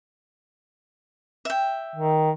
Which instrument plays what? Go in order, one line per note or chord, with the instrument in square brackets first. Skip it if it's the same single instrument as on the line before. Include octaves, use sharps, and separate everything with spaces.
[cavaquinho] E5 G5
[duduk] D#3